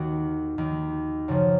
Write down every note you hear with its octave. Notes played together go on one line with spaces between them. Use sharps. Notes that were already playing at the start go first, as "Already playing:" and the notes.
Already playing: D#2 D#3 F#4
D#2 D#3
F#2 C#3 F3